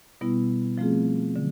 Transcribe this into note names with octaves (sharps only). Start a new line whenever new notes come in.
B2 G3 B3 E4
F3 A3 C4 F4 G#4
D3 F#3